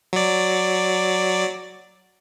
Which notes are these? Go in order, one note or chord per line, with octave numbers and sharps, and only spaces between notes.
F#3 D5